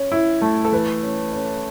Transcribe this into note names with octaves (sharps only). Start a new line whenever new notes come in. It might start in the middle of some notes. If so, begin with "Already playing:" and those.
Already playing: C#4
E4
A3
A4
E3 B4
C#4
C#4